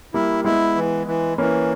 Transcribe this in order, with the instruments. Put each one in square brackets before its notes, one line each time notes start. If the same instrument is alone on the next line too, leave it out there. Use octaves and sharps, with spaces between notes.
[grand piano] G3 A#3 [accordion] E4
[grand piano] G#3 B3 [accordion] E4
[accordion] E3
E3
[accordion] E3 [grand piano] A#3 C#4